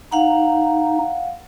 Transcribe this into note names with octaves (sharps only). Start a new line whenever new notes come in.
D#4 F5 F#5